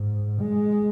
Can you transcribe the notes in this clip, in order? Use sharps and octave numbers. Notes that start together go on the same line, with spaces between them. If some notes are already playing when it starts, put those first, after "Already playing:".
Already playing: G#2
G#3